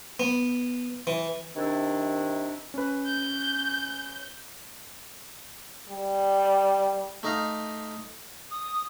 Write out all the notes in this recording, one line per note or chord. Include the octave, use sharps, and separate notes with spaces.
B3
E3
C3 D#3 D4 E4
C#4 B4
G6
G3
A3 D#4 F5
D#6